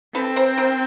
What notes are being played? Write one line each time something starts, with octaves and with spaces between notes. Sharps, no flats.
C4 A4 B4
A#4 C5
A#4 C5